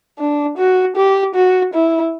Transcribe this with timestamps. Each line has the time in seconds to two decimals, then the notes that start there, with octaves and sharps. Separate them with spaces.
0.19 D4
0.58 F#4
0.96 G4
1.35 F#4
1.74 E4